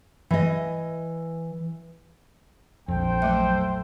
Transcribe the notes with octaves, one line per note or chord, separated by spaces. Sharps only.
E3 D#5
A#1 F2 A4 C5 G5
F#3 A3 E5